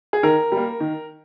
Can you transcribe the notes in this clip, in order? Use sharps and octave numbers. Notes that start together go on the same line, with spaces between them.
G#4
D#3 A#4
G3
A#3
D#3